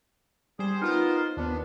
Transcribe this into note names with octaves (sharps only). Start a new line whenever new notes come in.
G3 G#4 C5
B3 D#4 F4 A#4 C5
D#2 B3 D4